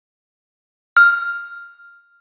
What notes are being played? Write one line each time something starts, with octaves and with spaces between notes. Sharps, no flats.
F6